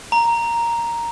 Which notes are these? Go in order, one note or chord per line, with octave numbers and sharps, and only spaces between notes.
A#5